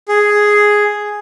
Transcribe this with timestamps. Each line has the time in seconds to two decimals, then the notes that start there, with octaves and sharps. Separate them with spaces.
0.09 G#4